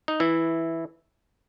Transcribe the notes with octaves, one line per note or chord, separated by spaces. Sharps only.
D#4
E3 E4